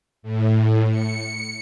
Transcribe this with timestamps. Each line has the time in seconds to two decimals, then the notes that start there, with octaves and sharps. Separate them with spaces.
0.23 A2
0.90 C#7